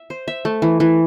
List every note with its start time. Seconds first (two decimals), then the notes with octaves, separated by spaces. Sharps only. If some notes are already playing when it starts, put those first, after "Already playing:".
Already playing: E5
0.10 C5
0.28 E5
0.45 A3
0.62 E3
0.80 E3